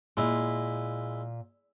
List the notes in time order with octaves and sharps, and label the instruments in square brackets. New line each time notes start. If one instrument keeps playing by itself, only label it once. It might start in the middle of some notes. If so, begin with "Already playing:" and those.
[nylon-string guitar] A#2 [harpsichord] G#3 E4